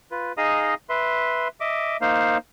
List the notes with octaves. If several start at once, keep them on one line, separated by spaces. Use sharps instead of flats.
F4 B4
D#4 G#4 D#5 F5 A#5 D#6
B4 E5 C6
D#5 E5 D6
A#3 D#4 C5 F5